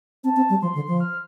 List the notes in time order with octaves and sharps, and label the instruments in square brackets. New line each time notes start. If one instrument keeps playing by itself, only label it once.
[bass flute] C4 [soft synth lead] A5
[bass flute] C4
G3
[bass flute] F3 [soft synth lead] C6
[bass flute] D3
F3
[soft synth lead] F6